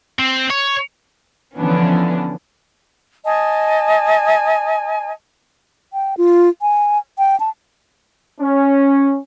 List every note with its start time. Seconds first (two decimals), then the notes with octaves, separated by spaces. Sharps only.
0.19 C4
0.50 C#5
1.58 D3 E3 F3 B3 C#4 D4
3.25 D#5 G#5 A5
5.93 G5
6.17 F4
6.62 G#5
7.18 G5
7.40 A5
8.41 C#4